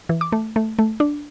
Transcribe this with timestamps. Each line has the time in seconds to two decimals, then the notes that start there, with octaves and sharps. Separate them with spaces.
0.09 E3
0.21 D6
0.32 A3
0.56 A3
0.79 A3
1.00 D4